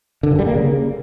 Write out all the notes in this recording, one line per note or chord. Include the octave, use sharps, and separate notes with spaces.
D3
G2
G3
A#3
C#3